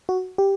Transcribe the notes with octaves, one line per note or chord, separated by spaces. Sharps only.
F#4
G4